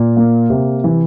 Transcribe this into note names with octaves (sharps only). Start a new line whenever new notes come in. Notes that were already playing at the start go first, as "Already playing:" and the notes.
Already playing: A#2
A#3
C3
E3